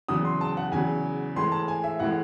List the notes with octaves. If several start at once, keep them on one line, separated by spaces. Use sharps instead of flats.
E2 C#3 F#3 D#6
C6
A5
F#5
E2 C#3 F#3 G#5
A2 E3 G#3 C6
A5
G#5
E5
A2 E3 G#3 F#5